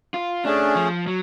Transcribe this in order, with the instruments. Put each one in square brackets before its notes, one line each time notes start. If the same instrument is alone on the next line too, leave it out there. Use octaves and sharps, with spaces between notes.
[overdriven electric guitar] F4
[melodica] A3 C#4 G#4 [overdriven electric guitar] D4
[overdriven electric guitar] F3
F#3